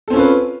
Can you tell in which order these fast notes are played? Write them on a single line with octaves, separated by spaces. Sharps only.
A4 C4 C#4 F4 B4